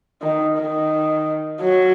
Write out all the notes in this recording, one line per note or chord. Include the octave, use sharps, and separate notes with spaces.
D#3
D#3
F#3